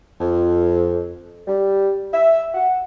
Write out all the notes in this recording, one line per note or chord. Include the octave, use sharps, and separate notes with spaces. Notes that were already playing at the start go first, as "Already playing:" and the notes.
F2
G3
E5
F#5